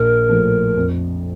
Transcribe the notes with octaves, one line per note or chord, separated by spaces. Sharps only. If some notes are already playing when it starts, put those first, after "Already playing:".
Already playing: A#1 A#4
A2 F3
F2